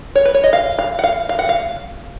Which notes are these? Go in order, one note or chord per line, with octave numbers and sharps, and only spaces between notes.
C#5
B4
C#5
D#5
F5
F5
F#5
F5
F5
F#5
F5